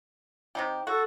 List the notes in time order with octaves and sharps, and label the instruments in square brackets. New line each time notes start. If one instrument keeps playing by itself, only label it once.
[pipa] C3 D#4 G4
[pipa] F#4 [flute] A4